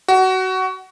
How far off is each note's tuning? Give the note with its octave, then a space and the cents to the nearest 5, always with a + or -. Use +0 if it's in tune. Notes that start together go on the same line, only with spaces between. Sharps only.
F#4 +20